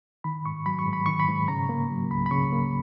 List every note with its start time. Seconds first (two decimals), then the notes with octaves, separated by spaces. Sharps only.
0.24 D#3 B5
0.45 G#2 C#6
0.66 F#3 B5
0.79 C#6
0.86 G#2
0.93 B5
1.06 D#3 C#6
1.19 B5
1.28 G#2
1.48 C#3 A#5
1.69 A#3
1.90 F#3
2.10 C#2 B5
2.26 B5
2.31 C#3 C#6
2.52 A#3